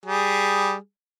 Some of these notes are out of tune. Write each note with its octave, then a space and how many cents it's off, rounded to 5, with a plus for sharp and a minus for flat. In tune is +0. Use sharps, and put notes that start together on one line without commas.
G3 +0 G#4 +0